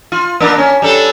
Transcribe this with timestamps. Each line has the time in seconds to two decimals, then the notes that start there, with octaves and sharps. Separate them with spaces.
0.12 F4
0.40 A#3 D4 A#4
0.58 C#4
0.82 G3 D4 A4